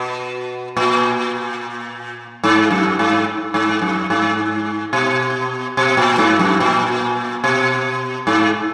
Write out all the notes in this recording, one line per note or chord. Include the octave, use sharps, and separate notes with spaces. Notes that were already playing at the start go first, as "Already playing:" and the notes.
Already playing: B2
A#2
G#2
F#2
G#2
G#2
F#2
G#2
B2
B2
A#2
G#2
F#2
A#2
B2
G#2